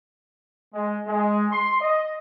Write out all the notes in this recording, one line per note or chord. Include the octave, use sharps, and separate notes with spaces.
G#3
G#3
C6
D#5